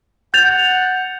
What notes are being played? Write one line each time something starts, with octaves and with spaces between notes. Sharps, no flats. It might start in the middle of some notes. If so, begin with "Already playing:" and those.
F#5 G6 A6 F7